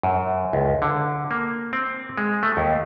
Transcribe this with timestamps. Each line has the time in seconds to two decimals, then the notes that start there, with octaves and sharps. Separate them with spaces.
0.03 F#2
0.53 C#2
0.82 D3
1.31 A#3
1.73 C4
2.18 G#3
2.43 A3
2.57 D#2